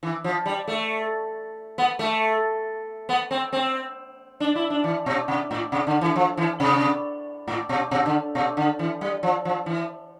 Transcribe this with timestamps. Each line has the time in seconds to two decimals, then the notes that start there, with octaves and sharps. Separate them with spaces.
0.03 E3
0.24 F3
0.46 G3
0.67 A3
1.78 B3
1.99 A3
3.09 B3
3.31 C4
3.53 C4
4.40 D4
4.55 E4
4.70 D4
4.84 E3
5.06 B2
5.28 C3
5.51 A2
5.72 C3
5.87 D3
6.01 E3
6.16 F3
6.37 E3
6.60 C3
7.48 A2
7.69 B2
7.91 B2
8.06 D3
8.35 B2
8.57 D3
8.79 E3
9.01 G3
9.23 F3
9.45 F3
9.66 E3